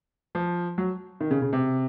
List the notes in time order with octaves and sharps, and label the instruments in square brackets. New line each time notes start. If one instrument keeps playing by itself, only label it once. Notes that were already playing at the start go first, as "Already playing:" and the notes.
[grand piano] F3
F#3
D#3
C#3
C#3
C3